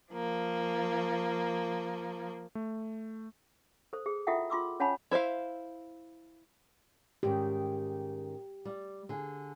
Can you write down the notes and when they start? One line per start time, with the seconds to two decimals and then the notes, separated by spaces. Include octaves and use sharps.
0.12 F3 A#3
2.55 A3
3.93 A4 C5
4.06 G#4
4.27 E4 F4 A4 E5 F#5 G5
4.50 F4 C6 D6 E6
4.80 C#4 C#5 F#5 G#5 A5 B5
5.11 E4 C5 E5 F5
7.23 G#2 D#3 C#4 G4
8.65 G3
9.09 D3 G#4